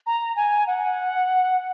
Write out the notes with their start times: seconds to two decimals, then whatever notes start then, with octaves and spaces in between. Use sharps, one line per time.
0.07 A#5
0.36 G#5
0.67 F#5